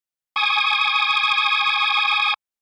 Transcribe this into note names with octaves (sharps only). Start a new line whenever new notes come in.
G#5 C#6 D#6